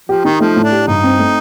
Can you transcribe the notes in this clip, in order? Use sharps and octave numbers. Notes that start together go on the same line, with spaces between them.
F3 G4
D#3 D#4
F3 A3
A2
D4
G4
G2 D#4
C4
A3